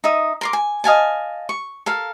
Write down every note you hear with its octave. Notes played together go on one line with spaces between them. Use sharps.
D#4 E5 D#6
A#4 C6 D6
G#5
D#5 F5 G#5 A5
C#6
A4 A#4 F5